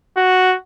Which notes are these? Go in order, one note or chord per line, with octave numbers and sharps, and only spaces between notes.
F#4